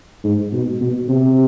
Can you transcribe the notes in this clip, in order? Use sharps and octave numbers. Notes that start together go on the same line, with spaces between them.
G#2
B2
B2
C3